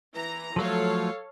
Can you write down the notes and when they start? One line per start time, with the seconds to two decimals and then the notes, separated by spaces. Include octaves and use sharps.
0.14 E3 A#5
0.56 F3 F#3 A3 A4 C#5 F5